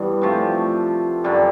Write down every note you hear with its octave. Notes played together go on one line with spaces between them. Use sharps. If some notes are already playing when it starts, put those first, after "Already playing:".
Already playing: G2 E3 G3 B3
C3 F3 A3
F#2 D3 G3